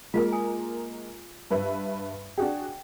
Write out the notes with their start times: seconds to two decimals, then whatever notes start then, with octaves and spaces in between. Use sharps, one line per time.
0.14 G#3 A#3 F4 G#4 A#4 D#5
0.32 G#5 D6 D#6
1.51 G2 B4 E5
2.38 D4 F#4 G#4 G5